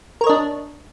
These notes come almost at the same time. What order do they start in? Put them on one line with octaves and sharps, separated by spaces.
A#4 C#5 D#5 D4